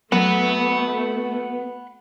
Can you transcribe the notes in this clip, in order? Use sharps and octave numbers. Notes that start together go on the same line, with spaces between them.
F#3 A3 B3 F#5 B5